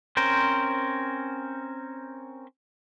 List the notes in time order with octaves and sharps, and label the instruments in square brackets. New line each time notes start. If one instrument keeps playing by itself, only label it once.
[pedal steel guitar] C4 C#4 A#4 C5